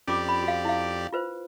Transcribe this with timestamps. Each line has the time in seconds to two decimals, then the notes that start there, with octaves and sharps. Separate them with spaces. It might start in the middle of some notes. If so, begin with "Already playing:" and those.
0.07 F2 C#4 F4 G4 D5 D6
0.29 B5
0.44 F#4 F5
0.65 E4 F5
1.13 F4 B4 C5